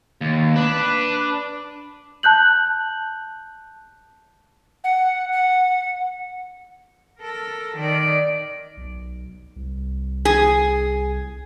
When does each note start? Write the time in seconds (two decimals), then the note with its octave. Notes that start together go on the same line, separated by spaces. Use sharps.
0.21 D#2
0.56 D4 B4
2.23 A5 F#6 G6 F#7
4.84 F#5
5.32 F#5
7.19 A4 A#4
7.77 D#3 D5
8.77 B1
9.56 C2
10.25 G#4